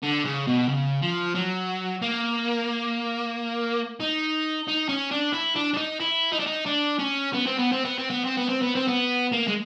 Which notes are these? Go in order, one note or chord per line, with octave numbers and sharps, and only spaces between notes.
D3
C#3
B2
C#3
F3
F#3
A#3
D#4
D#4
C#4
D4
E4
D4
D4
D#4
E4
D#4
D4
D#4
D4
C#4
B3
C4
B3
C4
B3
C4
B3
C4
B3
C4
B3
C4
B3
A#3
G#3